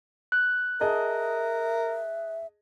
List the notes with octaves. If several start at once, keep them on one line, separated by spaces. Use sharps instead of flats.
F#6
G#4 A#4 D#5 E5 A5